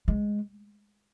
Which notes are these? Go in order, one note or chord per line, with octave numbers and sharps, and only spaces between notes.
G#3